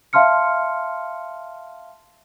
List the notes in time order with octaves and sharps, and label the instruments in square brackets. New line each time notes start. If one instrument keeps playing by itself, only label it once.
[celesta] E5 F5 A5 C6 F6 C#7